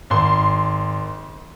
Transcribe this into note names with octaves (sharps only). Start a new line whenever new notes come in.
G#1 C6